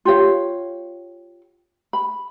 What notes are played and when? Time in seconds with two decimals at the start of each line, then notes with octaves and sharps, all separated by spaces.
0.05 F4 G4 C#5 F5
1.93 B5